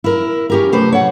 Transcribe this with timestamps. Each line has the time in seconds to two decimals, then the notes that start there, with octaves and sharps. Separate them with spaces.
0.04 E4 A#4
0.50 C#4 G4 A#4
0.72 C3 A3 B4 C5
0.92 C#5 F#5